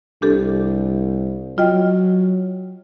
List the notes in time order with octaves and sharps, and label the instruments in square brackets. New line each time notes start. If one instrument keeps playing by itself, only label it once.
[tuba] C2 [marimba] D4 G4 A4
[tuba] F#3 [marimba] F4 D#5 G5